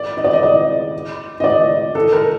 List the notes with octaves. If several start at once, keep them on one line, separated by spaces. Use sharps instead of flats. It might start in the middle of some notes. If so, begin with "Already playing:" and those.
Already playing: D5
D#5
D5
D#5
D5
D#5
D5
A4
A#4